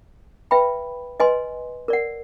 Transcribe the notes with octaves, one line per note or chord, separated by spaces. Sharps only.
B4 E5 G5 B5
B4 D#5 G#5 C6
A#4 D5 F#5